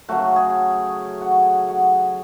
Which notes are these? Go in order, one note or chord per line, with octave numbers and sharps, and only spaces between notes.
C#3 F#3 A3 F#4
G#4
F#4
F#4